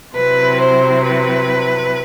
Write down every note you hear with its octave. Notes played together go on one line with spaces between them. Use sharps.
C3 F#3 C4 E4 B4
C5
B4